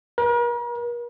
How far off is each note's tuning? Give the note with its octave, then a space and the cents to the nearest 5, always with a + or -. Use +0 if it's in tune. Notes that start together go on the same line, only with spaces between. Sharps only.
A#4 +45